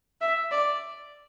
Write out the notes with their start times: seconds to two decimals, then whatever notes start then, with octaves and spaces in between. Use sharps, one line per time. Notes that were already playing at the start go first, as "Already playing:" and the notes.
0.21 E5
0.51 D5